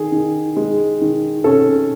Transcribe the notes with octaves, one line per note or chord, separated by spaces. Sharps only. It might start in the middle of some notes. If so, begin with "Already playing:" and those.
Already playing: D#3 G#4
D#3
G#3
D#3
C#4 A4